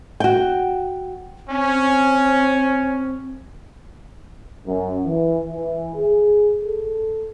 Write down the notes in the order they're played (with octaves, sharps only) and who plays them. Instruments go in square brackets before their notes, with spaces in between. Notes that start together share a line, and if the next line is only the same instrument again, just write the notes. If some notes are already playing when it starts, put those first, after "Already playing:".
[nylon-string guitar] F#4 G5
[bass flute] C4 [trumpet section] C#4
[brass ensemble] F#2
E3
E3
G#4
A4